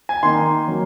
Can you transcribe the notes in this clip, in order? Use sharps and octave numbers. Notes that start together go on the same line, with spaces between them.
G#5
D#3 A#3 D#4 C6
F#3 A#3